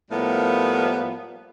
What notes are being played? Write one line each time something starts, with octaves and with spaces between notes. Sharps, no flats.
A2 F3 G3 A#3 B3